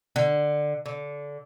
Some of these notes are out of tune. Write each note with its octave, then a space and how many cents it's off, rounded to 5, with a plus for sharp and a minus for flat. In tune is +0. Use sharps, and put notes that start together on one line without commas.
D3 +15
D3 -20